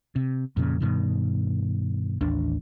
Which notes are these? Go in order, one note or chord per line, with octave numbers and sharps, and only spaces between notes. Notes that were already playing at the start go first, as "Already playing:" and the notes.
C3
F2 A#2 C#3
G2 B2 D#3
A1 D#2 D4